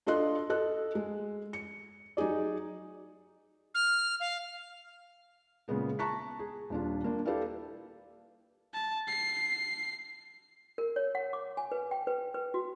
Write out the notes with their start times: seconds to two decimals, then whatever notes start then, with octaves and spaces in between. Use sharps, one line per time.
0.07 D4 F4 A4 D#5 C6 F#6
0.50 A4 D#5 F#6
0.95 G#3
1.53 C#7
2.17 F#3 D#4 G4 G#4 D5
3.75 F6
4.20 F5
5.68 A#2 C#3 G#3 B3 G#4
5.99 A5 A#5 C#6 F#6 B6
6.39 G#4
6.70 D#1 D4 F4
7.04 A#3 D4
7.25 E4 G4 A4 B4 D5 F5
8.74 A5
9.08 C7
10.78 A#4
10.96 C#5
11.15 F#5
11.33 D6
11.57 G#5
11.72 B4
11.91 G5
12.07 B4
12.34 B4
12.54 F#4